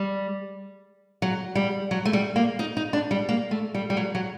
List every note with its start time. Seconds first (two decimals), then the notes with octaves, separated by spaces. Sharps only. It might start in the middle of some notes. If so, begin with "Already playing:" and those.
Already playing: G3
1.22 F#3
1.55 G3
1.91 F#3
2.05 A3
2.13 G3
2.36 A#3
2.59 D#4
2.77 D#4
2.93 D4
3.11 G3
3.29 A#3
3.51 A3
3.75 G3
3.90 G3
3.97 F#3
4.15 F#3